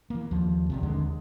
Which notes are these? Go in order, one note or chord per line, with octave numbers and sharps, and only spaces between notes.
E3 A#3
D#2 F3
B1 E2 C3
D#2 D3 G#3